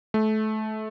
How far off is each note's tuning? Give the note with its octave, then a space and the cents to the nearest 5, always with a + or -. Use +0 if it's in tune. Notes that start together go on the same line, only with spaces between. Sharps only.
A3 -25